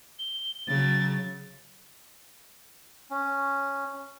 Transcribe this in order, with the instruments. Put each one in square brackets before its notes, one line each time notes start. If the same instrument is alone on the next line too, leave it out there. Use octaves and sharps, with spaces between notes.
[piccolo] G7
[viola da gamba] C#3 F#3 [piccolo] A6
[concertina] C#4